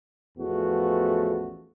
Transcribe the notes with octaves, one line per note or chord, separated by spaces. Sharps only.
A1 E2 F3 A3 B3 F#4